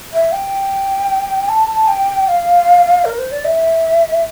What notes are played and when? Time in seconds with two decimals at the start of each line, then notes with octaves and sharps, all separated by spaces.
0.13 E5
0.32 G5
1.49 A5
1.88 G5
2.28 F5
3.05 A#4
3.18 C5
3.31 D5
3.45 E5